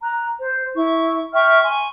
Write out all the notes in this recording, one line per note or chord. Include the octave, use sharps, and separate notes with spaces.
A#5 F#6
C5
E4 C#6
E5 G5 C#6 F6
G#5 C6 C#6